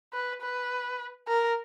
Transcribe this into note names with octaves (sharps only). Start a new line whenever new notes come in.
B4
B4
A#4